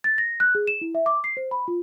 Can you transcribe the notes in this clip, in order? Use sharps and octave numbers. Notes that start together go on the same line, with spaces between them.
A6
A#6
F#6
G#4
E7
E4
E5
D6
C7
C5
B5
F4